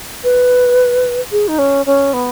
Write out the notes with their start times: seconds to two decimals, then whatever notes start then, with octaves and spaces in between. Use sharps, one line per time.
0.24 B4
1.32 G#4
1.48 D#4
1.59 C#4
1.86 C#4
2.13 B3